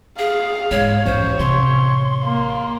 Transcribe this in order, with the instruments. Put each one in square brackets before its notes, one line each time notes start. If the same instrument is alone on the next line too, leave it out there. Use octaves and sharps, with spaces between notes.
[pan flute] G#4 [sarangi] F5
[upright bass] G#2 [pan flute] C#5
[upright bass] A1 F2 [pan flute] C5 [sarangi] C#5
[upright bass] A1 C3 [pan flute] C6
[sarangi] A#3